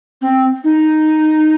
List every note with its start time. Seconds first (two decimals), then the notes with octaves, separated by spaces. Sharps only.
0.22 C4
0.64 D#4